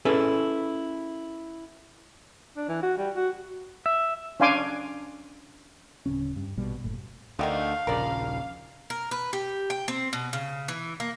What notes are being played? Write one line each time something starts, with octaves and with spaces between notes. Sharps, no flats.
C#4 E4 G#4 A4 B4
D4
E3
F#4
G3
F#4
E5
C#4 D4 F5 G#5 C6 D6
D1 B1 C#3 C#4
G2
A#1 B2 G3
F#1 A2
D2 D3 D#3 A3 F5
D#1 A#1 C#3 A#4 D5
A#4
B4
G4
G5
C4
B2
C#3
E3
A#3